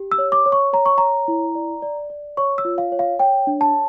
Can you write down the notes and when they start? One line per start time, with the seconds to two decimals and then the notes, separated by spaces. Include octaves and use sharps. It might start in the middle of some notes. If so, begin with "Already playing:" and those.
Already playing: G4
0.12 E6
0.18 C#5
0.32 D6
0.46 C#5
0.52 C#6
0.73 C#5 A#5
0.86 C#6
0.98 C#5 A#5
1.28 E4
1.55 D5
1.82 D5
2.10 D5
2.37 C#5 C#6
2.58 E6
2.65 F4
2.78 F5
2.92 C#5
2.99 F5
3.19 C#5 G5
3.47 D4
3.61 A5